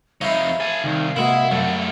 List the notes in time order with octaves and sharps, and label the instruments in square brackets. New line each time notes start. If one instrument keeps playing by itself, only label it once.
[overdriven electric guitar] F2 D#4 [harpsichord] E4 C#5 [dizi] F5
[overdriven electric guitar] A4 G#5 [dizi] F5
[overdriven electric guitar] C2 [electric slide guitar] D#3
[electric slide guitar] C3 F#4 [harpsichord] G#3 A#3 [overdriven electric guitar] E4
[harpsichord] F#2 [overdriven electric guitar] G3 A3